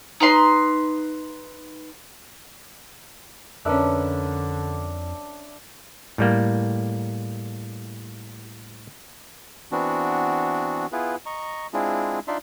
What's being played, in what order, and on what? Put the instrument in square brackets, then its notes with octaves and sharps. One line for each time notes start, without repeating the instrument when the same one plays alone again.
[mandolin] D#4 B4 C6
[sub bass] F2 [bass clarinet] D3 [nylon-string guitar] C#4 A#4 B4 [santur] D4 E5
[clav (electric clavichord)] A2 G3 A#3
[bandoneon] E3 B3 C4 D4 F#4
B3 E4 F4 G#4 B4
D#5 A#5 C#6
G#3 C4 D4 E4 F4 G#4
D4 D#4 F4 D5 E5 C6